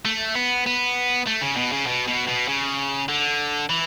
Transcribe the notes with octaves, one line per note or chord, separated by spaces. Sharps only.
A3
B3
B3
A3
C#3
B2
C#3
B2
B2
B2
C#3
D3
E3